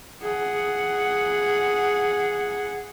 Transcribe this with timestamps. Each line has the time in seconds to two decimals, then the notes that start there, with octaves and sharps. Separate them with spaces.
0.23 G#4 F#5